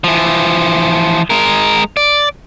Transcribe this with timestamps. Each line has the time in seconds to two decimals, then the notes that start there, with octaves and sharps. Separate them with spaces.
0.04 E3 F3
1.30 G#3 A#4
1.97 D5